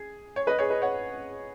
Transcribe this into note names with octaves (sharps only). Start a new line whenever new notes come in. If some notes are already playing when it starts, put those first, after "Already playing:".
Already playing: G#4
C#5
B4 D#5
G#4 C#5
B4 D#5
C#5 F#5